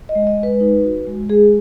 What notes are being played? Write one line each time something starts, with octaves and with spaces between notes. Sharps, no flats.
D#5
G#3
D#5
G#3
B4
D#4
F#4
G#3
G#3 G#4